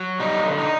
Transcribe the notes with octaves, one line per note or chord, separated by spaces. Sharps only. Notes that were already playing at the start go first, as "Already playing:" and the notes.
Already playing: F#3
G3 D#4
D3
D#4